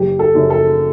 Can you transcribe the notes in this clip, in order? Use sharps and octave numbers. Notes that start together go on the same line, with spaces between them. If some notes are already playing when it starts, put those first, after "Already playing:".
Already playing: F#1 G4
A4
F#2 C#3
A4